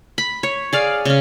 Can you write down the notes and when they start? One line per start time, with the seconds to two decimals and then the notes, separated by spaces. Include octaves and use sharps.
0.18 B5
0.43 C#5
0.73 G#4 D5 F5
1.05 C#3 C#4